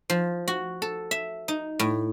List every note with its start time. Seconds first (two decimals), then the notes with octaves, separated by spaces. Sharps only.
0.10 F3
0.48 F#4
0.82 A4
1.11 E5
1.48 D#4
1.79 A2